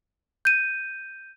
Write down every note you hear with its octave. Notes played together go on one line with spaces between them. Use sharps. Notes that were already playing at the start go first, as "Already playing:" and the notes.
G6 D#7